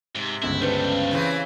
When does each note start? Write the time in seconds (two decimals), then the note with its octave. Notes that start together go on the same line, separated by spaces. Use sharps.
0.15 G#2 C3
0.43 G1 C#2 E4
0.62 G2 G3 A3 C#4 B4 C5
1.11 C#3 E3 C4